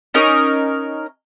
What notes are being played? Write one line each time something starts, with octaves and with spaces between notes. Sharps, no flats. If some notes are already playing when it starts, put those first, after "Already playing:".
C#4 D#4 A#4 D#5